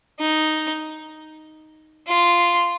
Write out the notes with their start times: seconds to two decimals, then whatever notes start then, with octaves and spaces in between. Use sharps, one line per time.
0.20 D#4
2.07 F4